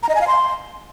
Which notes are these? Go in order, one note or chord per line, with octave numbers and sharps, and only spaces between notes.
A#5
D#5
G#5
F5
C6